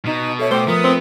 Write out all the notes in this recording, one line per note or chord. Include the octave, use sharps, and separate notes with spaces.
B2 D#4
A4 C#5 E5
A3 C5 G5 D6
F3 B3 A#4 D#6
C4